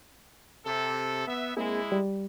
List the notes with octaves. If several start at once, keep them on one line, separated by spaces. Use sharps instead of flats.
C3 A4
B3 E5
G#3 A#3 C4 E4 G#4
G3